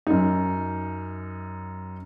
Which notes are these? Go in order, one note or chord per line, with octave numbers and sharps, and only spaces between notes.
F#2 D#4